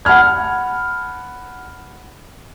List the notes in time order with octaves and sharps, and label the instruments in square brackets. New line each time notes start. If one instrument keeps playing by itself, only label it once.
[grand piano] F#5 A5 B5 F6 G#6